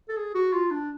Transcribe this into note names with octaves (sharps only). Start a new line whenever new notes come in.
A4
G#4
F#4
F4
D4